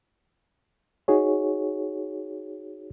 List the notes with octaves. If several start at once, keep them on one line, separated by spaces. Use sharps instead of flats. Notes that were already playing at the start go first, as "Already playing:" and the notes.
D#4 F#4 G#4 C#5